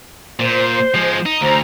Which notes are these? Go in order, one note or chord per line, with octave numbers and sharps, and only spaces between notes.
A#2 C5
F3 G#3
D#4
D2 C5 A#5